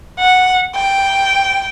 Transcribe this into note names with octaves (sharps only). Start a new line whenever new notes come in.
F#5
G5